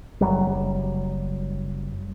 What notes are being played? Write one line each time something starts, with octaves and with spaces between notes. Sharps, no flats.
F#1 F#3 G3